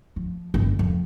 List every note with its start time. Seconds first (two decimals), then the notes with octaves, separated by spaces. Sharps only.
0.16 F3
0.54 G1
0.79 F2